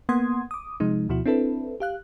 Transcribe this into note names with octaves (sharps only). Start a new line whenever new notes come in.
A#3 B3 F#5 C6 D#6 G#6
D6 D#6
C3 F3 G#3 D#4
D2 B2 F3 E4 F#4
C4 D4 E4 A4 B4
G4 F5 F#6